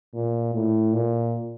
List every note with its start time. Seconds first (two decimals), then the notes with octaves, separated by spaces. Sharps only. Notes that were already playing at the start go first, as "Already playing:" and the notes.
0.14 A#2
0.54 A2
0.93 A#2